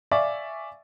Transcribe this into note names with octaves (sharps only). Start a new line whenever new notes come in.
D5 E5 F5 G#5 C#6